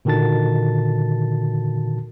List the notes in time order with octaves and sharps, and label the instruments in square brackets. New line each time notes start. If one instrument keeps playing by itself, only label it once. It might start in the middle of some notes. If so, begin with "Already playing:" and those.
[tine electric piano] A#2 D3 D#3 F#4 A5 A6